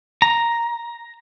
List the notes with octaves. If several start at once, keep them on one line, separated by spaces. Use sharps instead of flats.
A#5